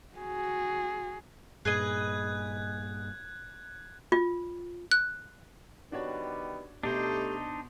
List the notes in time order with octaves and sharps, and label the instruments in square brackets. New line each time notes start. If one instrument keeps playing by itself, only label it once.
[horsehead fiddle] F#4 G#4
[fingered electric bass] G2 A#2 [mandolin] G#4 B4 D#5 [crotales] F#6 G#6
[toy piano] F4
[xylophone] F#6
[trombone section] D#3 G3 B3 [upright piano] D4 F#4 C#5
[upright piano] B2 [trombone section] A3 [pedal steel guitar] D4 D#4 C5 [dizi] G4